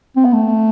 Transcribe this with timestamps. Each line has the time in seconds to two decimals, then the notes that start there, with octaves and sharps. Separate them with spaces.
0.16 C4
0.25 B3
0.33 A3